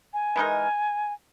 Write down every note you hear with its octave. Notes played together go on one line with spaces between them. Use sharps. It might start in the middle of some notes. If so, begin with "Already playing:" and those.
G#5
E3 G#3 D#4 A#4